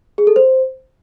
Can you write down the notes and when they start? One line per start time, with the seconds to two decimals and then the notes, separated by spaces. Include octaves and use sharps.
0.18 G#4
0.27 A4
0.36 C5